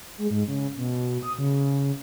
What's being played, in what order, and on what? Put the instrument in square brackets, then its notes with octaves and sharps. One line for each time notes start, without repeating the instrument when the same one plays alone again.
[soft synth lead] G#3
G#2
C#3
B2
D#6
C#3